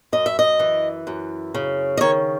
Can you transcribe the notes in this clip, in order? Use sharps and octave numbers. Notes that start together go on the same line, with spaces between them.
F#2 D#5
E5
D#5
E3
F#2
C#3
D#5
D#3 C#5